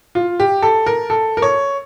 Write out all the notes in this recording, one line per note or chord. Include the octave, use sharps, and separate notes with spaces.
F4
G4
A4
A#4
A4
A#4
C#5